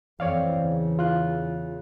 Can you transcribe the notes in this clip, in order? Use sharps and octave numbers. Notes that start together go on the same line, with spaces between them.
F2 E3 C4 C#5 D5 F5
E2 C#3
F4 F#6